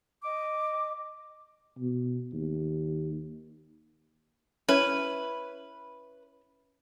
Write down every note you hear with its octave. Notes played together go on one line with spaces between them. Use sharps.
D#5 D6
B2
D#2
C#4 E4 B4